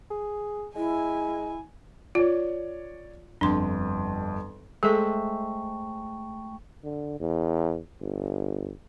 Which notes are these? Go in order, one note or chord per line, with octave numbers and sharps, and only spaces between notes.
G#4
G#3 E4 G#5
F4 C#5 D5
G1 F2 D4 C6
G#3 A3 G#4 A4 C5 E5 G5 C#6
D3
E2
G1